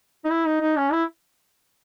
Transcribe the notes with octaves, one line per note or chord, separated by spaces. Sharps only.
D#4
E4
D#4
D#4
C#4
E4